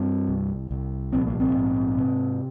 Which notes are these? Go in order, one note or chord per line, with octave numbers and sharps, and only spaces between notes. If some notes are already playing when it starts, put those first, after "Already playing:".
Already playing: G2 C4
C2
C2
A#1 C4
A#3
C4
G#2
C3